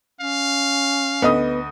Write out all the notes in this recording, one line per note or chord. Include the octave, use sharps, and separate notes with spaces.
C#4 F5
D2 B3 D#5 D#6